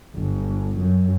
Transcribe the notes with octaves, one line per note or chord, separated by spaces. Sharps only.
G1
F#2